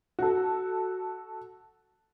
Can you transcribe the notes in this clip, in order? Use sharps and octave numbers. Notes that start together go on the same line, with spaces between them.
F#4 A4